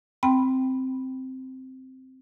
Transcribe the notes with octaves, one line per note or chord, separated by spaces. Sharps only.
C4 G5 B5